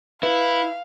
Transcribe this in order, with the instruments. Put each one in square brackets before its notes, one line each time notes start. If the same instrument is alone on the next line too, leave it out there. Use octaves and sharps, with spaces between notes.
[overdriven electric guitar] E4 [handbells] B4 [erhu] F5